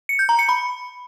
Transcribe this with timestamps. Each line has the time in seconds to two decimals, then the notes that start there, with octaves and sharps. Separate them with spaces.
0.09 C#7
0.19 G6
0.29 A#5
0.39 C#7
0.49 B5